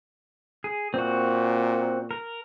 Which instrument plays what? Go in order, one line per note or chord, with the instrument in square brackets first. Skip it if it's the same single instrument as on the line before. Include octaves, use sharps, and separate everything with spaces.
[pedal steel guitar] G#4
[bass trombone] A#2 [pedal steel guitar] C4 F#4
[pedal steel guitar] A#4